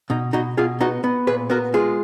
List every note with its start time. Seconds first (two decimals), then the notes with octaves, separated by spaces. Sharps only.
0.10 B2 D#4
0.33 B2 D#4 F#4
0.57 B2 F4 G#4
0.80 B3 D#4 F#4
1.04 B3
1.27 A#2 G#4 B4
1.50 B3 F#4 A#4
1.74 G#3 F4 G#4